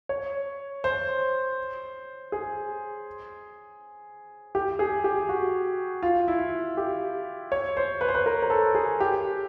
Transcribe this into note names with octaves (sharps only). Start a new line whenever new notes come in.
C#5
C5
G#4
G4
G#4
G4
F#4
F4
E4
G4
C#5
C5
B4
C5
B4
A#4
A#4
A4
G#4
G4